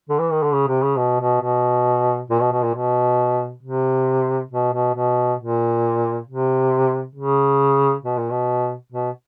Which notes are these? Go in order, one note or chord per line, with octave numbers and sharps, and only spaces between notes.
D3
E3
D#3
D3
C#3
C3
C#3
B2
B2
B2
A#2
B2
B2
A#2
B2
C3
B2
B2
B2
A#2
C3
C#3
B2
A#2
B2
B2